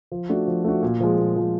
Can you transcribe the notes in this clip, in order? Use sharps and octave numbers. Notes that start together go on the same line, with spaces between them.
F3
A3 D4 F#4
F3
A3 D4 F#4
A#2
F3 G#3
A#2
F3 G#3